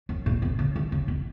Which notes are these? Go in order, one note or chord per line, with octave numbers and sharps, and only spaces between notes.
F#2
A#2
B2
C#3
D#3
C#3
B2